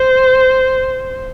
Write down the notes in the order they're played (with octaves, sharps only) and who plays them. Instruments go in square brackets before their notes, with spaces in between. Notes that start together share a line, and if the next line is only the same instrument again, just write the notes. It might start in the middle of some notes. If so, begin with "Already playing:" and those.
Already playing: [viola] C5